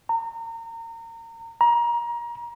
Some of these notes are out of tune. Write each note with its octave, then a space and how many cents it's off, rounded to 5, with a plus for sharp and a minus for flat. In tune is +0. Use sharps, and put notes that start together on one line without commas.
A#5 -30
A#5 +25